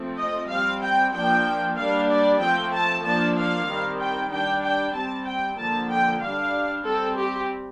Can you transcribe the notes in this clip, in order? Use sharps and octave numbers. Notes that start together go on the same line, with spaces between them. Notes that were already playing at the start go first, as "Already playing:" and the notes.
Already playing: F3 A3 C4
D#5
G3 C4 F5
G5
F3 A#3 D4 G5
G3 A#3 D4 F5
D5
F3 A3 C4 G5
A5
F3 A#3 D4 A5
F5
D#3 G3 C4
G5
G3 D4 G5
G5
G3 C4 A5
G5
D3 F3 A#3 A5
G5
G3 D4 F5
G3 C4 A4
G4